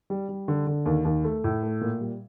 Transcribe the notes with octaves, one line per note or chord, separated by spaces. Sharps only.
G3
G3
D3
D3
D#2
D#2
A3
A2
A3
A#2
G3